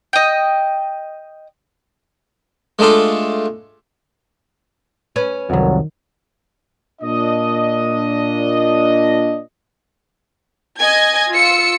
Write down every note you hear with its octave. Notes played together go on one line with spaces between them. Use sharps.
D#5 G5
G#3 A3 D4 F4 A4
C#4 B4
C2 F2 D#3 F#3
A#2 D4 D#5
D#5 G#5 G#6
F4 E6 C#7